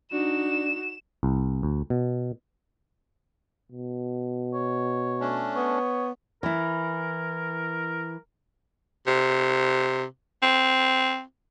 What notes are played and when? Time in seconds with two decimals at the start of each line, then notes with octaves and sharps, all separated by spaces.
0.12 D4 D#4 F#4 E7
1.23 C2
1.63 D2
1.90 B2
3.72 B2
4.54 C#5
5.21 A3 C#4 D4
5.55 B3 C#5
6.43 E3 E4 A#4
9.07 C3
10.43 C4